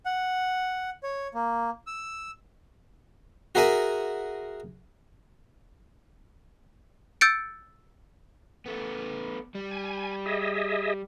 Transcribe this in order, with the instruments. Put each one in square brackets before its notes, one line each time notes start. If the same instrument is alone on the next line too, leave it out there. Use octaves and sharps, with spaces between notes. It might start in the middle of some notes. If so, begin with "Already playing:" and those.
[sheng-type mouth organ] F#5
C#5
A#3
E6
[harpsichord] F#4 G#4 A#4 E5 G#5
[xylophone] E6 G6 A6 C#7 D7
[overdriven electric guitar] A3 B3
G3
[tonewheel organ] G#5
G#4 D#5 E5